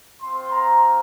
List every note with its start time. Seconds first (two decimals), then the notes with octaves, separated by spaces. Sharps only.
0.21 C4 F4 C6
0.51 A#5